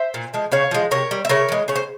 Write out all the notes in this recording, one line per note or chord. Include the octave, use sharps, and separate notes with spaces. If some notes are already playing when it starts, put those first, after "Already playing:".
Already playing: C5 E5
A#2
F3 G#3
C#3 C#5 F5
F3 G#3
C3 A#4 C#5
G3
E5
C#3 A#4 C#5
E3 G#3
C#3 C#5
C5